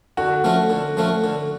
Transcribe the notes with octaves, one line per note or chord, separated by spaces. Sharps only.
D3 F#4
F3 A3 C#4
D3
F3 A3 C#4
D3